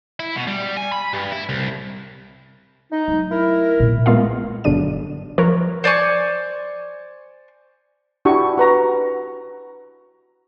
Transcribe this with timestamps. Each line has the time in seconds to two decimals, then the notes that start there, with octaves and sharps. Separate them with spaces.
0.20 E4
0.36 B2
0.47 G3
0.77 G#5
0.92 B5
1.13 G2
1.32 E4
1.49 C2
2.92 D#4
3.08 F#3 A3
3.32 E4 A#4
3.80 A#2 B3
4.06 G#3 A#3 B3 F4 D#5 F5
4.64 G1 B2 D3 F#3 D4 D#7
5.38 F3 A#4 B4 C#5
5.84 C5 D5 G#5 C#6
8.25 D4 E4 F#4 G4 C#6
8.57 F#4 B4 A#5